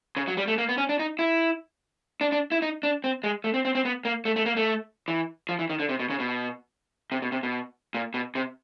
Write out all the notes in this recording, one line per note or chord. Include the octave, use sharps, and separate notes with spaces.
C#3
F#3
G3
A3
A#3
B3
C#4
D4
D#4
E4
D4
D4
E4
D#4
D4
C4
G#3
A3
C4
C4
C4
B3
A#3
A3
A3
A#3
A3
E3
F3
E3
D#3
D3
C3
B2
C#3
B2
C3
B2
C3
B2
A#2
B2
C3